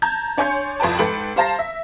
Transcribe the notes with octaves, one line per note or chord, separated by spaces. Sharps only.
A5 A#5 G6 G#6
D4 C#5 G#5 C6 G6 C#7
C2 F2 B4 G5 A5
G#2 A4 B4 G5 C#7 F#7
G3 C5 F5 A5 A#5 A#6
E5